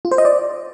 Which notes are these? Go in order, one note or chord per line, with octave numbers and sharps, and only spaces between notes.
F4
C5
D#5
D5